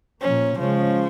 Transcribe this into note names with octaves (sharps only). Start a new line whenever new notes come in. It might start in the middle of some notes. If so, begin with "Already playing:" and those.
A#2 F3 A#3 C#4
C#3 F3 G#3 C#4